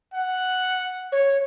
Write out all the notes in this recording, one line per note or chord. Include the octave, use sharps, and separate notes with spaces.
F#5
C#5